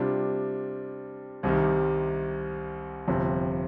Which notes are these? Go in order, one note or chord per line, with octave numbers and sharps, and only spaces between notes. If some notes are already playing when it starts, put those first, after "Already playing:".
Already playing: C3 G3 D4 F4
C2 C3 D#3 G3
G1 F2 C3